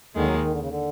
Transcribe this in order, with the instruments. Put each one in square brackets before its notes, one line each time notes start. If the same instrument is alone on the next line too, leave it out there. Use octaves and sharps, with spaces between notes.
[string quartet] D#2 D#3 G#3 [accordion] D3
[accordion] F#3
D#3
D3
C#3
D3